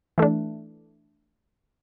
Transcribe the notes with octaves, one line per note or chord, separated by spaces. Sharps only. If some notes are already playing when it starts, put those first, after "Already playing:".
E3 A3 D4